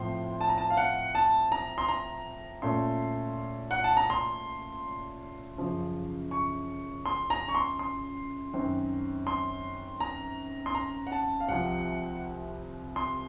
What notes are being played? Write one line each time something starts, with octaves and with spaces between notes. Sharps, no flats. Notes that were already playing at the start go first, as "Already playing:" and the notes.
Already playing: A2 F3 C4 C6
A5
A#5
A5
F5
F#5
A5
A#5
C6
A#5
A#2 A3 C#4 C6
F#5
A5
A#5
C6
F#2 C#3 F3
C#6
C6
A#5
C#6
C6
C6
F#2 D#3 F#3 C4
C6
A#5
C6
A#5
F#5
A5
F5
C2 C3 F3 C4 F#5
C6